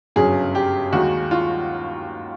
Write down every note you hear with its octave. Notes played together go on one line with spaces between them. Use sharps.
G1 F#2 C#3 F#3 G#4
G4
D#2 D#3 G#3 F#4
F4